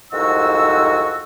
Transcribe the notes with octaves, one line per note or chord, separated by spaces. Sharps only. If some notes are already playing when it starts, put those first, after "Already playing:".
C2 F2 G#2 F#4 E6